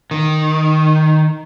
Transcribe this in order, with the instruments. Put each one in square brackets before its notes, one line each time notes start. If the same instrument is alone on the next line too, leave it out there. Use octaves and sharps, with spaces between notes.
[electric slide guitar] D#3